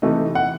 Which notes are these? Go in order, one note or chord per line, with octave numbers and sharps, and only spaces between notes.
C3 E3 A3 D#4
F#5